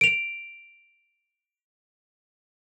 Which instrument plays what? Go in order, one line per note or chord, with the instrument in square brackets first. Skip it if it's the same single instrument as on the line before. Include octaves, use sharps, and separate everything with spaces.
[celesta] D7 F7